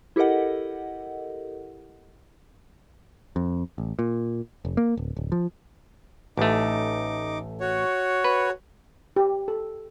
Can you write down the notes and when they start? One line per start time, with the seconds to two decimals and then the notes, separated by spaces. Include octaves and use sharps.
0.16 E4 G4 A4 A#4 D#5 F#5
3.36 F2
3.78 A1
3.99 A#2
4.65 F1
4.77 A#3
4.97 D1
5.17 D1
5.32 F3
6.37 A1 A3 D#4 D6
7.60 F#4 C#5
8.24 B4
9.16 G4
9.48 A4